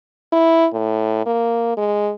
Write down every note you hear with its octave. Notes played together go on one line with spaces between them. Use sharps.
E4
A2
A#3
G#3